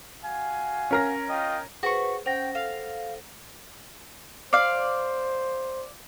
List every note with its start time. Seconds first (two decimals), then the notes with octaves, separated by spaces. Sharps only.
0.25 F#4 F5 G#5
0.91 C#4 A#4 A#6
1.28 F4 D#5 G5
1.83 F#4 G#4 B4 C5 C#6
2.26 C#4 C5 F#5 G5 A#6
2.55 A4 F5
4.53 C5 D5 F5